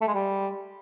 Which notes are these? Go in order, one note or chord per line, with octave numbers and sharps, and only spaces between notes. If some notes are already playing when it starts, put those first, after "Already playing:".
A3
G#3
G3